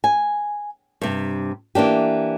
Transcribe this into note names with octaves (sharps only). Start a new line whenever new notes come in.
G#5
G2 C3
E3 A#3 D4 G4